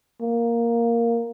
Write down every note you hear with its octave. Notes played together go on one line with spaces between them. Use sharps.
A#3